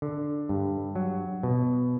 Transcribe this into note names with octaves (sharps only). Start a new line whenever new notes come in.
D3
G2
F#3
B2